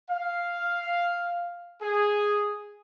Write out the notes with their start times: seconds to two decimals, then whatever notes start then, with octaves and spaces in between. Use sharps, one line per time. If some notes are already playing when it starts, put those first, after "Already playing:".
0.11 F5
1.82 G#4